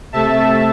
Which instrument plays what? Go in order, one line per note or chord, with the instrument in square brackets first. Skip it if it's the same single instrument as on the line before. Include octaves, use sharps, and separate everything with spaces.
[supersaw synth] C3 A3 E5 A5